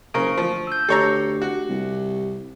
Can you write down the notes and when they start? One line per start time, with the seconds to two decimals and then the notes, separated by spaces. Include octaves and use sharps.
0.14 F#1 C#3 A#4 C5 C#6 D7
0.37 D2 F3
0.67 E6 G6
0.89 D2 G4 A4 C#5 A#5
1.42 F#4
1.69 C2